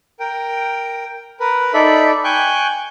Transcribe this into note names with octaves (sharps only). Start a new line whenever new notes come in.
A#4 G5
A#4 B4
D#4 A4 D5 E5 B5
G5 G#5 C#6 F#6 G6